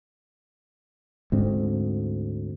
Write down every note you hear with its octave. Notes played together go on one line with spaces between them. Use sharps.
D2 G#2 C4